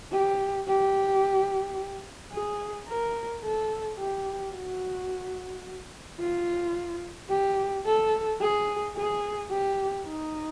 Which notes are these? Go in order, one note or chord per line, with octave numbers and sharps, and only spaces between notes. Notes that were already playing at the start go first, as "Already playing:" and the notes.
G4
G4
G#4
A#4
A4
G4
F#4
F4
G4
A4
G#4
G#4
G4
D#4